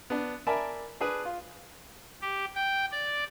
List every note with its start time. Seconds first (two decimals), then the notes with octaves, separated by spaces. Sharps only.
0.10 B3 D4
0.47 A#4 D5 E5 G#5 A5 B5
1.01 D4 G#4 B4
1.25 F4
2.21 G4
2.55 G5
2.92 D5